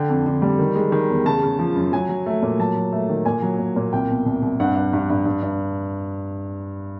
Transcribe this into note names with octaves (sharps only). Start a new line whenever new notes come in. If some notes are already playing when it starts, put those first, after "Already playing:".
Already playing: D3 G5
F2
D3
G3
D#3
G#3
D#3
E2
C#3 A5
C#3
F3
F#2
F#3 G#5
F#3
A3
A#2
F#3 A5
F#3
A3
D#3
A#2 G#5
F#3
A#2
A#2
C2 G5
B2
C2
C2
G2 F#5
G2
G2
G2
G2
G2